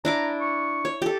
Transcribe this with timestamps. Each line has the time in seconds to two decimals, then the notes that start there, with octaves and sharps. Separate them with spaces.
0.05 D4 E4 A#5 D6
0.41 C#6
0.85 C#5
1.02 G4 A4